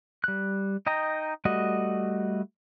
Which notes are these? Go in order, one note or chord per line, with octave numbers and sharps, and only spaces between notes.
G3 F#6
D#4 D#5 G5 A#5
G3 A3 F#4 D#5